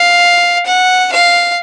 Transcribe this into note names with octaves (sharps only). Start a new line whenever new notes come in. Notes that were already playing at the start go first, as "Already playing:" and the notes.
Already playing: F5
F#5
F5